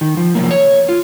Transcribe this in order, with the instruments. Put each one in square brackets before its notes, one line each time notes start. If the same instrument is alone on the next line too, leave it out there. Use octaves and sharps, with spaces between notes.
[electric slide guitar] D#3
F3
C3 F3 F#3 A#3
C#5
F4